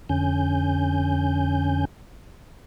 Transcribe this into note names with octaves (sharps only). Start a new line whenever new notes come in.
F2 D3 C#4 G#5 G6